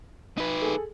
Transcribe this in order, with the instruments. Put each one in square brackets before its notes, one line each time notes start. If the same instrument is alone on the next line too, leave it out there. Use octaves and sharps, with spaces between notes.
[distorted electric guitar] D#4 B4
[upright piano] G#4 A4